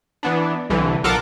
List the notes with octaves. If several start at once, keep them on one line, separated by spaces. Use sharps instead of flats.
E3 B3 D4
C2 D3 E3
B1 F4 A4 A#4 F#5 D6